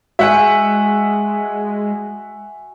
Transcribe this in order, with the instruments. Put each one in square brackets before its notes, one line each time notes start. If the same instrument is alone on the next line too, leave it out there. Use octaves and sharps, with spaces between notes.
[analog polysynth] G#3 [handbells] F#4 G#5 [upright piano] E5 F#5